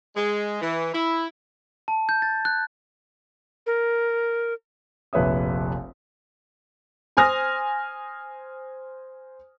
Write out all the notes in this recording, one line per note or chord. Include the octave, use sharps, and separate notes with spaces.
G#3
E3
E4
A5
G6
A6
F#6
A#4
F1 A#1 B4 C#5 E5 D#6
C5 G#5 D#6 F6 A#6